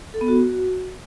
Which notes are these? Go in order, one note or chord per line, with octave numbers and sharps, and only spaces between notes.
A4
B3
F#4